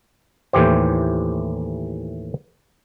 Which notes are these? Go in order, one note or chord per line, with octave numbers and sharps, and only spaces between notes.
D#2 A2 E3 G4 C5